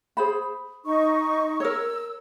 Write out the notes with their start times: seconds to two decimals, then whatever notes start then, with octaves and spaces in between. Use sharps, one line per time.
0.17 G#4 C5 B5
0.85 D#4 C#6
1.60 A#4 C#5 E6